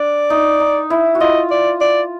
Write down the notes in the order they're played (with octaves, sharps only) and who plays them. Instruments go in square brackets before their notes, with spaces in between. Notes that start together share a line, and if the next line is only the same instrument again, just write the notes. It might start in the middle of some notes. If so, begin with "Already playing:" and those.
Already playing: [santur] D4 [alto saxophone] D5
[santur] D#4
D#4
E4
F#4
[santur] F4 [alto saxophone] D#5
[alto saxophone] D5
D5